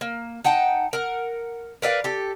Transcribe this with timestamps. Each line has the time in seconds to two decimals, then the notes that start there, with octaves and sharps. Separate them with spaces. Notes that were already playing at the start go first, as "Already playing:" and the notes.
0.01 A#3
0.44 D#4 F#5 G5 A5
0.93 A#4 F#5
1.82 A#4 B4 D5 F5
2.04 G4 A4